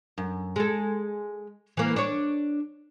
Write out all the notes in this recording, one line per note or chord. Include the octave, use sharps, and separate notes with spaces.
F#2
G#3 A4
E3 A#3
D4 C#5